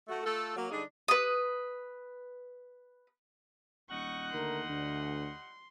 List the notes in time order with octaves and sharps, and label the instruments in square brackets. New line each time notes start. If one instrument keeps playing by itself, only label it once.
[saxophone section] A3 F#4
A3 F4 A4
F#3 A#3
D3 G3 D4 D#4 G#4
[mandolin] B4 D#6
[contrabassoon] D#1 [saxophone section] G3 D#5 F#5 [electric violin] C#6 F#6
[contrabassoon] D#2 [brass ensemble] D3 A3 A#4 [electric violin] C6
[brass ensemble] D2 [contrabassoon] D3